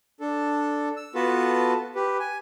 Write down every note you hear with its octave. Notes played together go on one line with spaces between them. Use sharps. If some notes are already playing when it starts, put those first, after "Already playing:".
D4 A4
E6
B3 F4 F#4 A4 B4 A5
G4 B4
G#5